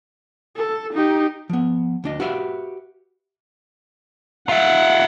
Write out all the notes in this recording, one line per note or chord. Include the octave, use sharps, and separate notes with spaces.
A4
D#4 G4
F3 B3
D2 D4 D#5
F#4 G4 B4 E5 F5
F4 E5 F#5